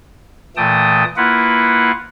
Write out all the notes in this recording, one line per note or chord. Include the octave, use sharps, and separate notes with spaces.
A#2 E3 A3 G5 A5 D#6
A#3 E4 F4 B4 F#5